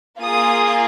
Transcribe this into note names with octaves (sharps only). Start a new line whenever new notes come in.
A#3 F4 G#4 D#6